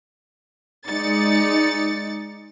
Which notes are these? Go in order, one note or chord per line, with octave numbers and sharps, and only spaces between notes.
G#3 D#4 D5 A6 C#7